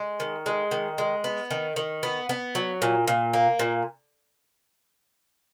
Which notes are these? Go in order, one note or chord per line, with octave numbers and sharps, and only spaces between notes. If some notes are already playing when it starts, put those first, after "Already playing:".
Already playing: G#3
D#3
G#3
D#3
G#3
B3
D#3
D#3
B3
B3
F#3
A#2
A#2
A#3
A#2